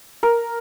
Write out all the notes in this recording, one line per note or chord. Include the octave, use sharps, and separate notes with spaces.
A#4